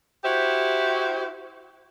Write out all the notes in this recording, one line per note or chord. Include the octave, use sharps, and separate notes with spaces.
E4 F#4 G4 C5 E5